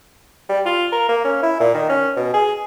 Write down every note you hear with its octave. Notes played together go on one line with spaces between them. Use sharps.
G3
F4
A#4
A#3
C#4
E4
A#2
D#3
C#4
B2
G#4